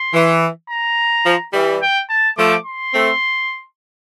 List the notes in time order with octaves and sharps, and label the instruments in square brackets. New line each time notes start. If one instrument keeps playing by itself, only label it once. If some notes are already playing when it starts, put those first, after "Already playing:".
Already playing: [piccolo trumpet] C6
[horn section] E3
[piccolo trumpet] A#5
[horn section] F3
E3 G3
[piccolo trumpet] G5
A5
[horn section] F3 A3 [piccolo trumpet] D6
[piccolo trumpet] C6
[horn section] A3 C4